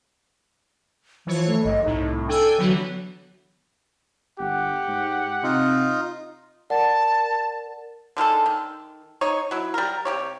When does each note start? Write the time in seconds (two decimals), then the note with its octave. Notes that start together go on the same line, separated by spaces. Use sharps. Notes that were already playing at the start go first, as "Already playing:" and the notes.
1.27 E3 F3 C#5
1.47 A3
1.65 G#1 G2 D#5
1.85 C2 A2 D#4
2.28 D4 A4 G5 G#5
2.58 D3 E3 F#3 B3
4.39 G1 G4 F#5
4.88 G#2
5.43 C3 D#4 F4
6.70 A#4 D5 F#5 A5
8.17 D3 D#3 G#3 A4
8.46 D#3
9.21 D#4 C#5
9.51 F#3 E4
9.74 G3 A#4
10.05 C3 G4 C#5